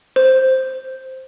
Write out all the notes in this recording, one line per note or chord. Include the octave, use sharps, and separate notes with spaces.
C5